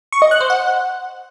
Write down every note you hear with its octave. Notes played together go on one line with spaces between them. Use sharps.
C#6
D#5
F#6
C5
F#5